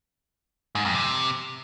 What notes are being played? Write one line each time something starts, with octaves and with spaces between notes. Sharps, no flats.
G#2
F2
C3